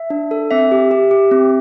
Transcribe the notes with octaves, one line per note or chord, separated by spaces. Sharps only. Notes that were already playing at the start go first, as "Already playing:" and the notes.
Already playing: E5
D4
A4
C4 E5
G4
G4
G4
C4